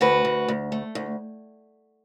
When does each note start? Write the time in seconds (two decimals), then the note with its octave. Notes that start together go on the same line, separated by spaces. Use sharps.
0.01 D2 F#4 B4
0.25 D2
0.48 D2
0.72 A3
0.95 D2